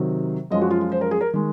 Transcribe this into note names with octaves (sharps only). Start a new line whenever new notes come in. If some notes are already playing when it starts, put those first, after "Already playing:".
Already playing: C3 D#3 F#3
F#2 F3 G#3 D#5
F#4
F4
F4
C5
A#4
G#4
A#4
D#3 G#3